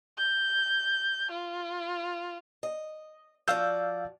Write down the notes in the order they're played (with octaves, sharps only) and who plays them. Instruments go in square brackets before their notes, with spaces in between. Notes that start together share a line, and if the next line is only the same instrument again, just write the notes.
[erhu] G6
F4
[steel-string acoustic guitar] D#5
[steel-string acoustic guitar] F3 F#4 D5 [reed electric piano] F5 E6 G6